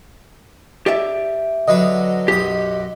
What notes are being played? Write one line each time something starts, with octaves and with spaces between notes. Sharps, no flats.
G4 D5 E5
D3 F#3 B4 D#5
B1 F#2 G4 D#6